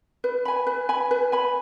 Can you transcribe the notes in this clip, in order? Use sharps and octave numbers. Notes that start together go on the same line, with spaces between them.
B4
G#5 B5
B4
G#5 B5
B4
G#5 B5